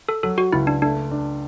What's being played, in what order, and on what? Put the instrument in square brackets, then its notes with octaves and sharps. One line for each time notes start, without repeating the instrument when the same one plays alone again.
[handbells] A4
[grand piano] F#3 [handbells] A4
[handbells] F#4
[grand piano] C#2 [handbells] E4
[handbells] D4
[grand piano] A3 [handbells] D4
[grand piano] D4